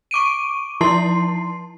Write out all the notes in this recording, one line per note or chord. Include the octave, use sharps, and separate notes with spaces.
C#6 D6 D7 D#7
F3 E4 A5 C6 C7